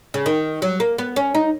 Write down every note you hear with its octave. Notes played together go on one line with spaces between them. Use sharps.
C#3
D#3
F#3
A#3
B3
C#4
D#4